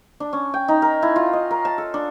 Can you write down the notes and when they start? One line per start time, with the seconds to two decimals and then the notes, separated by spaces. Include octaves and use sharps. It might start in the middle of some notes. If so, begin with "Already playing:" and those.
0.20 D4
0.33 C#4
0.54 G5
0.68 D#4
0.82 A#4
1.02 E4
1.16 F4
1.33 D#5
1.51 A#4
1.65 A5
1.78 A4
1.94 D4